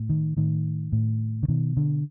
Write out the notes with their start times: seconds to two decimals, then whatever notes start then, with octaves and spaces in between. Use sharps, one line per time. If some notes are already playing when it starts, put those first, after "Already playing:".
Already playing: A2
0.09 D#3
0.37 A2 D#3
0.92 A2
1.43 D3
1.48 B2 D#3
1.77 D3